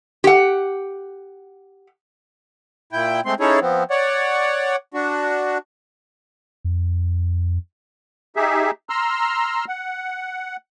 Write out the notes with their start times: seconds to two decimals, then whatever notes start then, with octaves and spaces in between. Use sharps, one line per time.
0.24 G4 F#5
2.93 A#2 E4 G5
3.25 G#3 A3 C4 C6
3.40 C#4 D#4 E4 G#4 A4 C#5
3.61 F3 B3 C4
3.91 C#5 D5 F#5
4.94 D4 F#4
6.65 F2
8.36 D#4 G4 G#4 E5
8.89 A#5 C6 E6 F6
9.68 F#5